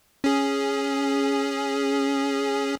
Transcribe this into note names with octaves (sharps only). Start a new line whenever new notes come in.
C#4 G#4